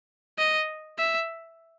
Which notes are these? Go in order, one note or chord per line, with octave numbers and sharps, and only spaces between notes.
D#5
E5